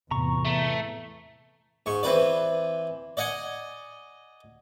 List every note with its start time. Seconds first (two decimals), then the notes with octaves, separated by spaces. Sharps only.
0.11 E2 A2 C3 A#5 C#6
0.45 A3
1.86 G#2 C#6
2.03 E3 C4 B4 D5
3.17 D5 D#5 F#5 G#5